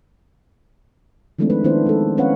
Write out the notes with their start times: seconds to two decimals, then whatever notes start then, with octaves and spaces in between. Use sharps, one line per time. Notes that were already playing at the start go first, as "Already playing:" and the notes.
1.39 D#3 F3 G#3 A3 C4 D4
1.50 B4
1.64 D#3 B3 D4 E4 C5
1.86 G#3 A4
2.17 B3 C#4 B4 C#5 F5 F#5